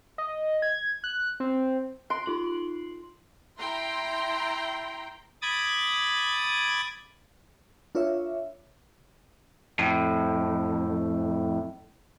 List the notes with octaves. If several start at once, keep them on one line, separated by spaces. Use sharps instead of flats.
D#5
G#6
F#6
C4
C6 F#6 D7
D#4 F4 F#7
E4 G5 A#5 C6
B5 D6 D#6 G#6 A6
D4 F4 A#4 C#5 E5
F2 A2